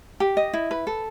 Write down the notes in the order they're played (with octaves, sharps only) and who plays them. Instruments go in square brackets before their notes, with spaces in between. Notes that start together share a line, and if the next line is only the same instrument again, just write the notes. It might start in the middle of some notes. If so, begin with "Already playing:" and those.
[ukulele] G4
D#5
E4
B4
A4